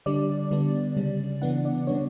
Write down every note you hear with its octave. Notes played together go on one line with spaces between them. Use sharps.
D3 G3 D4 D5
D3 G3 B3 D4
C#3 G3 C#4
C#3 E3 B3 D4 F#5
D5
C#3 G3 B3 D4 C#5